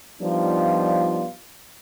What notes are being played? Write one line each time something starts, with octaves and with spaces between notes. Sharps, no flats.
F3 G3 B3 D4 D#4 F4